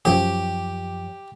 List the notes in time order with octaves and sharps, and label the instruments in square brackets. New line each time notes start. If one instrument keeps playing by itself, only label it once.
[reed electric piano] F#2 F3 C#5 [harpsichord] G4